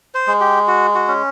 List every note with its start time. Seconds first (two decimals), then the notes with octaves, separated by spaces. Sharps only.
0.14 C5
0.27 G#3
0.41 G4
0.67 F#4
0.95 F#4
1.08 C#4